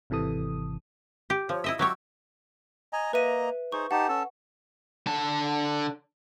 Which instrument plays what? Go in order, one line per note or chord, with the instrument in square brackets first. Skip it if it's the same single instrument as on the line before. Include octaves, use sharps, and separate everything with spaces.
[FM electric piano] G#1 C3 E3 A4 D#6
[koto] G4
[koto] F3 [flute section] C#5
[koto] E4 D#5 E5 [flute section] E6
[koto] F#3 G4 C#5 [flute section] C#6 E6
[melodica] D#5 G#5 A#5
[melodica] A#3 D#5 A#5 [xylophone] B4 E5 D#7
[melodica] D#4 G#4 C5 [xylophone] C#6
[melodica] D#4 G4 A5 [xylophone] F#5
[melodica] C#4 A4 A5
[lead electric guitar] D3 A5